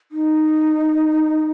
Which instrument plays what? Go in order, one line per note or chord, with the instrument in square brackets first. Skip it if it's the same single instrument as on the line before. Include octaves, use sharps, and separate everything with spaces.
[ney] D#4